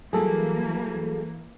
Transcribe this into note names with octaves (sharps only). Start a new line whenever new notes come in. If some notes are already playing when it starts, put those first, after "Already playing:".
E3 F#3 G3 A#3 G#4 A4